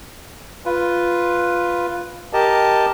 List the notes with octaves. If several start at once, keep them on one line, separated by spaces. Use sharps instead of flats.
F4 B4
G4 A#4 D#5 A5